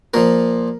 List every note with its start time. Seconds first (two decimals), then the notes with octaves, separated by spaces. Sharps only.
0.14 A#2 F3 A#4